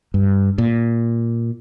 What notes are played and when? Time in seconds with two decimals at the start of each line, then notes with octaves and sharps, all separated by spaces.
0.14 G2
0.58 A#2